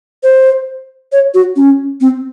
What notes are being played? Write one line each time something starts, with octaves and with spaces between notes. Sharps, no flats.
C5
C#5
F#4
C#4
C4